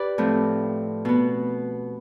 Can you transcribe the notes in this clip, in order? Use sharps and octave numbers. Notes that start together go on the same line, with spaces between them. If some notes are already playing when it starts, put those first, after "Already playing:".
Already playing: G4 B4 D5
A2 F3 A3 C4
B2 B3